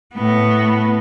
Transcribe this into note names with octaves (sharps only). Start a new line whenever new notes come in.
A2 B3